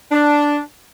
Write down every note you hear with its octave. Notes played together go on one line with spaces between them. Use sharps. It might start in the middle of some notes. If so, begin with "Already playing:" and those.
D4